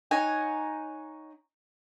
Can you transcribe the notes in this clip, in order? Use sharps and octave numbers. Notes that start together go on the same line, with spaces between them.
D#4 C#5 F#5 G#5